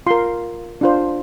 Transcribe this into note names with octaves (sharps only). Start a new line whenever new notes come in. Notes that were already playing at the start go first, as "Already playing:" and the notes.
F4 A#4 C6
D4 F4 C5